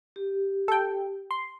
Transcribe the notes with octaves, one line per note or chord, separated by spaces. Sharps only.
G4
A4 G5
C6